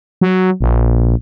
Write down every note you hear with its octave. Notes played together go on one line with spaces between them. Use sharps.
F#3
A#1